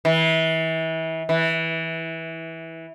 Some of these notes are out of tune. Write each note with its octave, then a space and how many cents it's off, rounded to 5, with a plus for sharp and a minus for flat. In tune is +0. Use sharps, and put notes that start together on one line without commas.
E3 -30
E3 -15